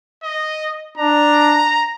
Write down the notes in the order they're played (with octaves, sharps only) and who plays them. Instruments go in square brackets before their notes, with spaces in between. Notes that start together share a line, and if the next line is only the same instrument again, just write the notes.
[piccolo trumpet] D#5
[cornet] D4 [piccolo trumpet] A#5